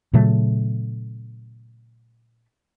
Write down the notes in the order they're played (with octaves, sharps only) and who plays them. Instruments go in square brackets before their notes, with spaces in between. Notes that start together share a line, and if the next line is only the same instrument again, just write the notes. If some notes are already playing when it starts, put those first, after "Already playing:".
[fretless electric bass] A#2 C#3 F#3 A3